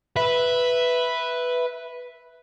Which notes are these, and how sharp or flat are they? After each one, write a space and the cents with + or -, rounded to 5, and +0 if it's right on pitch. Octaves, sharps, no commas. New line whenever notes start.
B4 +0 E5 +0